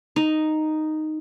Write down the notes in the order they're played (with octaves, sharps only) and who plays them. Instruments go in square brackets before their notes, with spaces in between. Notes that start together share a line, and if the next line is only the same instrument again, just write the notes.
[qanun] D#4